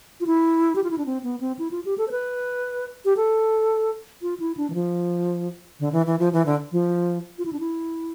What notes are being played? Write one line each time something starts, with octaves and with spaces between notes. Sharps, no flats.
F4
E4
G4
F4
E4
D4
C4
B3
C4
E4
F4
G4
A4
C5
B4
G4
A4
F4
E4
D4
E3
F3
D3
E3
E3
F3
E3
D3
F3
F4
E4
D4
E4